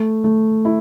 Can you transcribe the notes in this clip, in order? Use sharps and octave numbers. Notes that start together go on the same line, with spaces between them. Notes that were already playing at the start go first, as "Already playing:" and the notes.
Already playing: A3
A3
E4